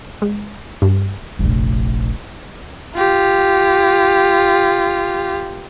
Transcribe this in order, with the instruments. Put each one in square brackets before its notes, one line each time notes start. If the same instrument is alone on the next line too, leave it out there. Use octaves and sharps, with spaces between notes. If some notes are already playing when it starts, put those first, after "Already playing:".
[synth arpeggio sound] G#3
G2
[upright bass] F1 A#1
[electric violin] F4 G4